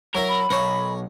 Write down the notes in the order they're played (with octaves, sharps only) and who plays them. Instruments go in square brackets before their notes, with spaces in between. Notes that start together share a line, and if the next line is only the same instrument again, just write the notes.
[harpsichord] F#3 E4 E5 [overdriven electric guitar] A#4
[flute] B5
[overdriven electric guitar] B1 [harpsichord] A#4 C#5